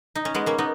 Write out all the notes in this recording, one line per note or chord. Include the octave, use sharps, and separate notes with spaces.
D#4
C#4
G#3 B3
A#3 C#4
B3 D#4